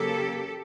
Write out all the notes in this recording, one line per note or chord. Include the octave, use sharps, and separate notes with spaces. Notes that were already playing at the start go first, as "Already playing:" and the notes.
Already playing: C#3 F#3 A#3 G4 A4